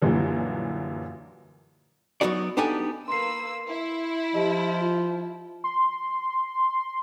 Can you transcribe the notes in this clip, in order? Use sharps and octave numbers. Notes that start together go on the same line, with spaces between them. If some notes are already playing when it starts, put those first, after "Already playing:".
F#2 A#2 D3 E3 G3
F#3 B3 C#4 D#4 F#4 D5
B3 D4 D#4 G4 A4 G#5
A#3 B4 C6 E6 C7
E4
F3 G4 D#5
F4
C6